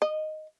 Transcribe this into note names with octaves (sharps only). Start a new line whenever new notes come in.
D#5